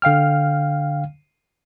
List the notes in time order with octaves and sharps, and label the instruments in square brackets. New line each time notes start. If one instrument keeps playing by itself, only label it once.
[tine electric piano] D3 F5 G5 F6